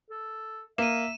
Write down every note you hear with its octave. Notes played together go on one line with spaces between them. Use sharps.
A4
A#3 E5 D#7 E7